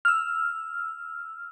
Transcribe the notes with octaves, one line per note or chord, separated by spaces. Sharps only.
E6 F6